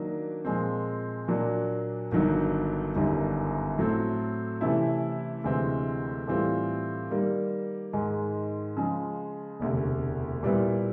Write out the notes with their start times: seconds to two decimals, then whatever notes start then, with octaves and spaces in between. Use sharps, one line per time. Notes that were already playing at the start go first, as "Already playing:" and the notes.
Already playing: D#3 F#3 A#3 D4
0.45 A#2 F3 G#3 C4
1.28 A#2 F#3 A#3 D4
2.12 G1 G2 D#3 F#3
2.95 G1 F#2 D#3 G3
3.78 A2 F#3 A3 C4
4.61 C3 E3 A3 C#4 E4
5.44 D2 C3 E3 G#3 C4
6.27 A2 E3 G3 C4 F4
7.10 D#3 G3 A#3
7.93 G#2 D#3 G#3
8.77 C#3 F3 G#3
9.60 E1 D2 C3
10.43 A#2 G3 B3 E4